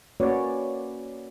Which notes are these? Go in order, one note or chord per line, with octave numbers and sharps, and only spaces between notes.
A#3 C#4 F#4 B4 C#5 D5